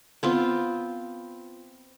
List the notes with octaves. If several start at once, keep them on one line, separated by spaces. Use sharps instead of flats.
B3 C4 F4